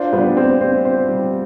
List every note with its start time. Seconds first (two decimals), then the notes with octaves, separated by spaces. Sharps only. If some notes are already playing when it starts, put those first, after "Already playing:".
Already playing: D4 F4 C5
0.13 G3 B3 D4
0.36 C4 C5
0.61 C4 C5
0.85 C5
1.09 G3